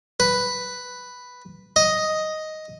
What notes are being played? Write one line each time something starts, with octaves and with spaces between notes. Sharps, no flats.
B4
D#5